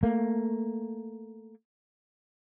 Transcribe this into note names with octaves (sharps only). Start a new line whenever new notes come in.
A3 A#3